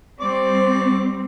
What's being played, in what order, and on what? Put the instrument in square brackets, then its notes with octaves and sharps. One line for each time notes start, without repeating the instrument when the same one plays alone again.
[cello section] G3 C4 [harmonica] D5 C#6 D6